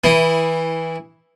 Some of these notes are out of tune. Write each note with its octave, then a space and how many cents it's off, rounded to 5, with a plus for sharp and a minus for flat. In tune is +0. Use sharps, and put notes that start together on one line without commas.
E3 -15 E4 +0 D#6 +0